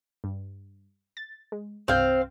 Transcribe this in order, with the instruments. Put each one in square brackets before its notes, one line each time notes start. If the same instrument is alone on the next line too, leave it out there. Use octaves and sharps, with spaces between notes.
[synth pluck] G2
A6
G#3
[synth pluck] C2 G2 G6 [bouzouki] C4 F5